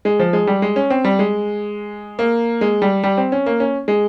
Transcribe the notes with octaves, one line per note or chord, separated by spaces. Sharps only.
G#3
F3
G#3
G3
G#3
C#4
C4
G3
G#3
A#3
G#3
G3
G3
C4
C#4
A#3
C#4
G#3